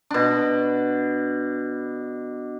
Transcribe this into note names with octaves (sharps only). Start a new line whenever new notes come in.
B2 D4